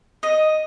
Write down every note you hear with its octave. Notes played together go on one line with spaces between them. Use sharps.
D#5